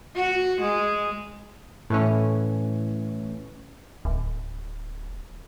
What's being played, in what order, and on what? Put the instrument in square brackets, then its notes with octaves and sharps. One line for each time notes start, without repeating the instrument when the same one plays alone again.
[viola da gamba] F#4
G#3
[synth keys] A2 E3 C#4
[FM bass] D1